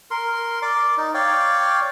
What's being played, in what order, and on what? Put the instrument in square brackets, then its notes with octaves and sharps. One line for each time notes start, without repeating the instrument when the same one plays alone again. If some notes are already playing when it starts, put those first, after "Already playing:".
[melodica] A#4 C6
D5 D6
D#4
C#5 D5 F5 G5